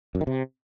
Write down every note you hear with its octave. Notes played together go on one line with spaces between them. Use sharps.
F#2
D#3
C3